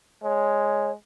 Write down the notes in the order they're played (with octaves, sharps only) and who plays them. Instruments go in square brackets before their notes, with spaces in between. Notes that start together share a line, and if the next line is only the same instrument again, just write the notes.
[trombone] G#3 [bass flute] C#5